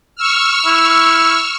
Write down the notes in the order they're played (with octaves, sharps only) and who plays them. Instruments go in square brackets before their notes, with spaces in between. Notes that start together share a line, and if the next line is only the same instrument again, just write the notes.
[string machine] C#6 E6 F6
[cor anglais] E4